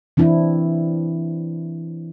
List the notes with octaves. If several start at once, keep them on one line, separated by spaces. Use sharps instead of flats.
E3 C4 D4 E4